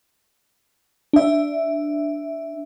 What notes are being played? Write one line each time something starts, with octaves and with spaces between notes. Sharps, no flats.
D4 E5